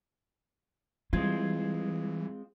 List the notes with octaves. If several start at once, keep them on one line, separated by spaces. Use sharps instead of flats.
E3 G3 G#3 C4 E4 F4 G#6